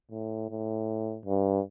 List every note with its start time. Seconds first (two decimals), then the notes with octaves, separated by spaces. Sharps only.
0.11 A2
0.50 A2
1.25 G2